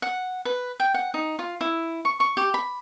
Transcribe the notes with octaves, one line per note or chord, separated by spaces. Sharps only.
F#5
B4
G5
F#5
D#4
F4
E4
C#6
C#6
G4
B5